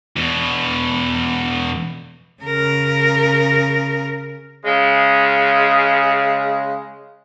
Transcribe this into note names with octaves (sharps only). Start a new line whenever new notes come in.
E2 B2
C#3 A#4
C#3 G#3